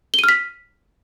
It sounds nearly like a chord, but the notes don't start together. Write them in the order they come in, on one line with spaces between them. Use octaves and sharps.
G7 D#7 F6 B6